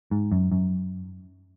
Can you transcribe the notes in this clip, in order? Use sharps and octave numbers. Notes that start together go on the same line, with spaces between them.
G#2
F#2
F#2